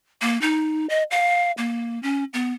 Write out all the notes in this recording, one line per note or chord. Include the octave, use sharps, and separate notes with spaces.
A#3
D#4
D#5
F5
A#3
C#4
B3